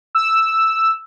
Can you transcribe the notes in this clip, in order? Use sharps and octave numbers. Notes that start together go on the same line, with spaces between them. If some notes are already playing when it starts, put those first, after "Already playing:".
E6